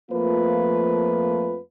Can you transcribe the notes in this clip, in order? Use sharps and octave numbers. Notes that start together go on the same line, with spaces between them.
F2 F3 A3 A#3 F4 B4